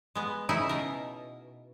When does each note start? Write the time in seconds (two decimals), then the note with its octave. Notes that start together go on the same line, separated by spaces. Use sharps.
0.15 G#3 B3
0.49 C#3 D#4 E4 E5
0.69 B2 A#4